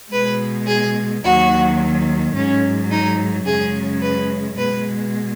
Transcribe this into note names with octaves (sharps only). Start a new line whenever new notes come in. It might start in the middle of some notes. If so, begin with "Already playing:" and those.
B2 G#3 B4
G#4
D#2 D#3 F#3 F#4
G#2 F#3 C#4
D#4
F#2 C#3 G#3 G#4
B4
B2 G#3 B4